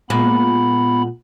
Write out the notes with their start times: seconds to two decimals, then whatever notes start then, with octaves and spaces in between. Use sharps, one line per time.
0.10 A#2 G#3 B3 B5